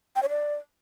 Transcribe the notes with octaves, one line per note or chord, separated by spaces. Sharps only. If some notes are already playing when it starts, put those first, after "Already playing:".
G5
C#5
D5